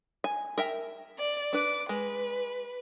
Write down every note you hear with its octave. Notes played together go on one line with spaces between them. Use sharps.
G#5
A#4 E5 G5
D5
D4 B4 D6
G#3 B4